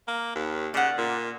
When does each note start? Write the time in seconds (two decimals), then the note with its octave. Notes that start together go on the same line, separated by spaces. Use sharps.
0.08 A#3
0.35 D#2
0.74 C#3 D5 F#5
0.98 A#2